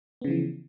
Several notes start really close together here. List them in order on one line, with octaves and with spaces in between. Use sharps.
B3 C#3 F3 E3